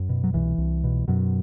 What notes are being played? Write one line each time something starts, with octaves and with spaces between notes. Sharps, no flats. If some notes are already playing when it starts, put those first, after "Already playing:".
Already playing: F#2
B2
F#3
C2 E3
C2
B2
F#2 B2 F#3